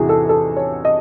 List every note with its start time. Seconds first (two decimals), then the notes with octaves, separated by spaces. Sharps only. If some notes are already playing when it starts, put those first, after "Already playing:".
Already playing: E2 C3 E3 F#4 G#4
0.09 A4
0.29 A4
0.57 C#5
0.85 D#5